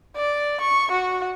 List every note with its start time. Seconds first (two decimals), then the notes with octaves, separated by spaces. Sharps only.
0.17 D5
0.61 C#6
0.91 F#4